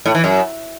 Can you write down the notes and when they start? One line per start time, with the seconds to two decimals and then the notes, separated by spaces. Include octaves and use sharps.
0.06 A2
0.15 E3
0.24 F#2